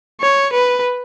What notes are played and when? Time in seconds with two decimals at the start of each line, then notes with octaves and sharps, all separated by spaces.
0.21 C#5
0.53 B4